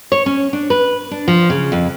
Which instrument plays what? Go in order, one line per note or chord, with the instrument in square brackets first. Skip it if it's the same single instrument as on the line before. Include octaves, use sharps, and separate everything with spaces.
[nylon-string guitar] C#5
C#4
D4
B4
D4
F3
C#3
F2